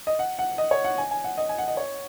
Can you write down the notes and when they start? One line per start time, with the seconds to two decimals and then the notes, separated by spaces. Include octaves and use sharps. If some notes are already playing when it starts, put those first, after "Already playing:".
0.07 D#5
0.19 F#5
0.39 F#5
0.58 D#5
0.71 C#5
0.85 F#5
0.98 G#5
1.11 G#5
1.24 F#5
1.38 D#5
1.49 G#5
1.58 F#5
1.68 D#5
1.77 C#5